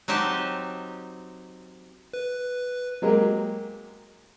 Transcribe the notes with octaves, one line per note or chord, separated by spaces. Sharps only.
F#3 C4 D#4 G4 A5
B4
F#3 G#3 A#3 G4 A#4